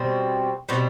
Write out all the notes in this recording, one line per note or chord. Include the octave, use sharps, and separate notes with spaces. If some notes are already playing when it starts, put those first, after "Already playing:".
Already playing: B2 G3 C4
B2 G3 C4